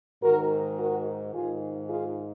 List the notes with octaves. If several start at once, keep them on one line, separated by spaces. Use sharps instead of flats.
G#2 D#3 F#4 A#4
F#4 A#4
G#2 D#3 F4 G#4
F4 G#4